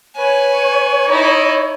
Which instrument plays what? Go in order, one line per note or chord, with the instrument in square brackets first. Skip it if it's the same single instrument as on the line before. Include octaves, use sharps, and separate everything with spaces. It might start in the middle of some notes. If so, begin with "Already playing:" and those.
[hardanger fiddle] B4 G#5 [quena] C#5
[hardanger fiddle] D#4 E4